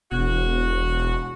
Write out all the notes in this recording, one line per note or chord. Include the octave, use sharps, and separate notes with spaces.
E1 F#4